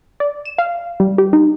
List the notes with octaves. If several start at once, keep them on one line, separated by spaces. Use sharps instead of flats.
D5
E7
F5
G3
G4
D#4